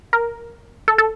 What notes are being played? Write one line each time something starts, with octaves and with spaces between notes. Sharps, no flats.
A#4
A4
A4